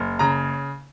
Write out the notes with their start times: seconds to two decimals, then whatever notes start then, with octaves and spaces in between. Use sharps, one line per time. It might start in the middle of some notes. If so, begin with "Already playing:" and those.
Already playing: F#1
0.19 C#3 A#5